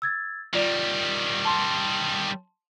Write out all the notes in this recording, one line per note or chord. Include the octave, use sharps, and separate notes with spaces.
E6 G#6 A6
D#3 G3 F4 D5
A5 C6